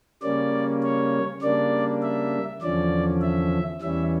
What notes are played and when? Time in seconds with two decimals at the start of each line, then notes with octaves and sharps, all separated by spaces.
0.22 C#3 G3 A#3 C#4 D5
0.83 C#5
1.42 C#3 G3 A#3 D4 D5
2.02 E5
2.62 E2 D3 F3 C#4 D5
3.21 E5
3.82 E2 E3 G3 C#4 E5